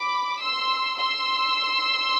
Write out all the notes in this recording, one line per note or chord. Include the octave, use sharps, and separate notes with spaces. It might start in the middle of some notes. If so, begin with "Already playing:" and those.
Already playing: B5 D6
C6 E6
C6 E6